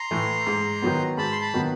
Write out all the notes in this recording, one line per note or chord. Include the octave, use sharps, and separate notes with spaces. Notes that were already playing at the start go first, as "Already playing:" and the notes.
Already playing: A#5 C6
A2 E3 A3
G#2
D#3 F#3 B3
G#2 A5 B5
C6
A5 B5
D#3 F#3 B3